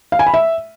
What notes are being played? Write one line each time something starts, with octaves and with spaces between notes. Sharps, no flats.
F5
G#5
B5
E5